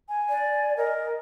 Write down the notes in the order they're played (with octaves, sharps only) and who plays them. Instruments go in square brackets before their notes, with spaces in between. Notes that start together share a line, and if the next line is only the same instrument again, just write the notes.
[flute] G#5
[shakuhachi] D5
[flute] A#4 [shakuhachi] D#5